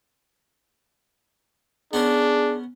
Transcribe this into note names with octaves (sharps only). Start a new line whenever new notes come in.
B3 C#4 D4 G#4 A#4